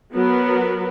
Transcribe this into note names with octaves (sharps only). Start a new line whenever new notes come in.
F#3 B3 F#4 A#4 B4